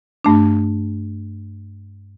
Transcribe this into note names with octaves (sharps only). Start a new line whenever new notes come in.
G2 A3 D4